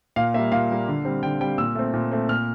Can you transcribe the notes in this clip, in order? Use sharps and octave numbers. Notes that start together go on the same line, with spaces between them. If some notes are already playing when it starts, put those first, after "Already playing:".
A#2 F5
G3 A#3 E5
A#2 F5
G3 A#3
D3
G3 C4
D3 G5
G3 C4 G5
A#2 E6
A3 C4
A#2
A3 C4
A#2 F6